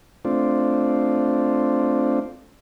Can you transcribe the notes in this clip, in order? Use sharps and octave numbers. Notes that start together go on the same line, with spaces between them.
A3 C4 D4 F4